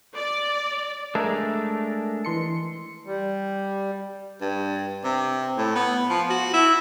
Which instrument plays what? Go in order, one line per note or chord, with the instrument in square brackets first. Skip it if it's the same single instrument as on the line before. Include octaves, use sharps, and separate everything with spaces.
[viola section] D5
[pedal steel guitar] G#3 A3 D4 [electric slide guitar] A#4
[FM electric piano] E3 C6 C#7
[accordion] G3
[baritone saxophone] G2
C3
A2
B3
F3
F#4
E4